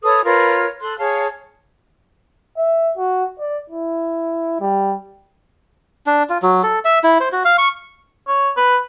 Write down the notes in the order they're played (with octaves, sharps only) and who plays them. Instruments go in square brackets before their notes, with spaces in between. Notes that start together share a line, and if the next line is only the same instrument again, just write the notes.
[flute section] A4 B4 C#5 D#6
F4 A#4 B4 C#5
A4 C6 F#6
G#4 C#5 F5 A5
[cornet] E5
F#4
D5
E4
G3
[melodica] D4
F4
F#3
A4
E5
E4
C5
F#4
F5
C#6
[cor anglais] C#5
B4